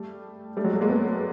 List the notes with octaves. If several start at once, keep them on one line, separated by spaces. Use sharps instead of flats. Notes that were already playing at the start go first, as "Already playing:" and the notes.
Already playing: G3 A3
G3 A3
F#3 G#3
G3 A3
G#3 A#3
A3 B3